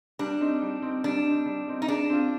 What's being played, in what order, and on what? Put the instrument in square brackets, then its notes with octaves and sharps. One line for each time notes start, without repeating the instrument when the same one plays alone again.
[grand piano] G3 [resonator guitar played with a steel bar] D4
[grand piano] C4 D#4
G3
C4 D#4
[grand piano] G3 [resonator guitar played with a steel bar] D4
[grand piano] C4 D#4
G3
C4 D#4
[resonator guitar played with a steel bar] D#4
[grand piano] G#3 [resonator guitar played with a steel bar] D4
[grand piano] C4 F4